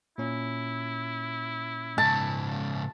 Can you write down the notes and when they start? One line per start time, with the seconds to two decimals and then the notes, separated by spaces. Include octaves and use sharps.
0.18 A#2 C#4 E4
1.98 G#2 C#3 A5